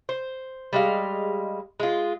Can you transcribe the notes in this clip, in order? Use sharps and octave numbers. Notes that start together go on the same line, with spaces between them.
C5
G3 G#3 F5
G#3 F4